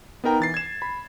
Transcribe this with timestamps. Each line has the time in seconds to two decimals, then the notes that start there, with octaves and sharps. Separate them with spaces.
0.24 B3 D#4 A#4 G5 A#5
0.40 E3 A6 C7
0.54 G#6 E7
0.82 B5